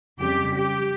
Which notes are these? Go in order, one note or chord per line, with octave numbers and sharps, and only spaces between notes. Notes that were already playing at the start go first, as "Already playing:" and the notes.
F2 C#3 G3 G4
G4